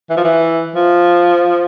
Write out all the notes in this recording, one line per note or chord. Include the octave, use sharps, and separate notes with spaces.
E3
F3
E3
F3